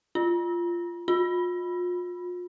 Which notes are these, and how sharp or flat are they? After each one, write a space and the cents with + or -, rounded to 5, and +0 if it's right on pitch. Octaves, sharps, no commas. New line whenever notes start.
F4 -10
F4 +35